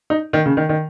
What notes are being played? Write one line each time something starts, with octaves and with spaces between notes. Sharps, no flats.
D#4
D#3
C#3
D#3
D#3